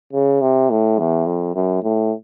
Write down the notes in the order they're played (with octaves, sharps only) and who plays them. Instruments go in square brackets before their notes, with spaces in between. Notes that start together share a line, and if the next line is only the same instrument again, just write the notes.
[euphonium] C#3
C3
A2
E2
F2
F#2
A2